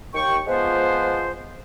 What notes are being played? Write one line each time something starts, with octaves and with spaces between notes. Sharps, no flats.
D#2 G5 C#6
F3 G#3 B3 F4 B4 C5